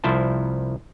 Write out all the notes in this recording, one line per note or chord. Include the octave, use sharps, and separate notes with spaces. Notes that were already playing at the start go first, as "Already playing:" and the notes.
C2 F3 E4 C5 A5